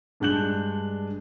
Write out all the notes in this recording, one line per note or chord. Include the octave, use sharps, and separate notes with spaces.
G2 G#3 D4 F#6 G6 F#7